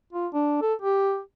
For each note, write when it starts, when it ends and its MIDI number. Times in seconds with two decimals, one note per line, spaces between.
0.13 0.27 65
0.34 0.61 62
0.62 0.74 69
0.82 1.20 67